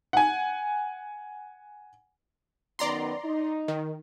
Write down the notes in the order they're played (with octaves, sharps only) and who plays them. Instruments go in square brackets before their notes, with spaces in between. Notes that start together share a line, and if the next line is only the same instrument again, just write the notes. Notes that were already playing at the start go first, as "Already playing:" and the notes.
[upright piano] F#5 G#5
[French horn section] F#2 D#3 B3 [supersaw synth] D5 A#5 C6
[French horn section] D#4
[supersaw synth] D#3